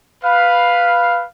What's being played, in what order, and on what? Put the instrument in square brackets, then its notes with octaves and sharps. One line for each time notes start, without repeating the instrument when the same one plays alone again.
[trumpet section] B4 F5